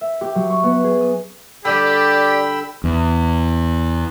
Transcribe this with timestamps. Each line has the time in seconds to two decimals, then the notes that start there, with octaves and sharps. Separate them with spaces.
0.01 E5
0.21 G4
0.35 F#3
0.50 C#6
0.63 B3
0.84 G#4
1.01 D#6
1.65 D3 G3 G4 D5 G5 B5 E6
2.84 E2